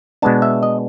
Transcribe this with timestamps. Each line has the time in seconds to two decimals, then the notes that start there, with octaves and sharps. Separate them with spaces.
0.22 B2 G#3 B3 D4 A5
0.42 E5
0.63 D#5